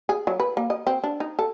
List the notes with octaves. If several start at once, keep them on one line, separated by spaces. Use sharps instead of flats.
G#4
F#3
B4
A#3
D#5
C4
D4
D#4
A4